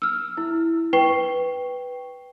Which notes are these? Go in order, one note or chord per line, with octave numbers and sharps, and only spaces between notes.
E6 F6
E4
B4 G5 C#6 C7 G7